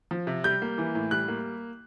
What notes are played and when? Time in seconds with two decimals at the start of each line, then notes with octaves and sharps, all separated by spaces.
0.11 F3
0.27 C3
0.44 G3 G6
0.62 A#3
0.78 E3
0.95 A2
1.11 G3 F#6
1.28 A#3